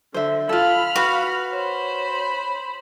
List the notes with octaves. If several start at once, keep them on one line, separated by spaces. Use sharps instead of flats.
D3 C5 E5
F4 A4 F5 B5 F6
F#4 B4
C5 C#5 B5